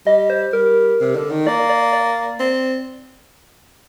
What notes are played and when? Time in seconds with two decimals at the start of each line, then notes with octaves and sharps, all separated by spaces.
0.06 G3 D#5
0.30 C5
0.53 G3 A#4
1.01 C3
1.15 D3
1.30 D#3
1.47 A#3 D5
1.70 D5
1.93 D5
2.40 C4